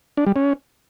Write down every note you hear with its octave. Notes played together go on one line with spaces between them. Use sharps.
D4
G3
C#4